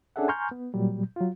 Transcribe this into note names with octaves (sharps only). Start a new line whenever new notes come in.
C#4 D4 G#4 A4 E5 F#5
G#5 A#5 C6 C#6 F6 G6
B3
A#2 F#3 G3
F#3 F4